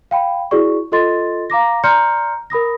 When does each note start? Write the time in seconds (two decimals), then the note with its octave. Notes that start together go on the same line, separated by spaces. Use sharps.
0.11 F5 G5 B5
0.51 E4 F#4 G#4 D5 C#6
0.92 F4 A4 D#5 C6 A6
1.50 F5 A#5 D6 A#6
1.84 D5 A#5 C6 F6 G6 C#7
2.50 A#4 B5 D#6 A#6